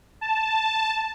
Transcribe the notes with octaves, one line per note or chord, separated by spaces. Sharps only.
A5